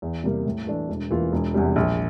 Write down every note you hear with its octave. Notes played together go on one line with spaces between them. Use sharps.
E2
C3 G3 A#3
A2
E3 A3 D4
E1
E2 E3 A#3 F4
E1
E2 C3 G3
A#1